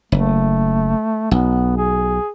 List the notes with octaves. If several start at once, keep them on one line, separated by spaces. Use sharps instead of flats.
F#1 A3
B1 B3
G#4